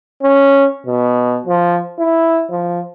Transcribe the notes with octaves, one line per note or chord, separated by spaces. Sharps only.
C#4
B2
F3
E4
F3